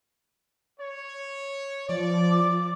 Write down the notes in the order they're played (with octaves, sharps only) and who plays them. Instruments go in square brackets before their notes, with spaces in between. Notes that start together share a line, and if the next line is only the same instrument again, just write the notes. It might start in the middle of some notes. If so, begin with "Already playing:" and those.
[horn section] C#5
[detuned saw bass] F3 [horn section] D5
[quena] D6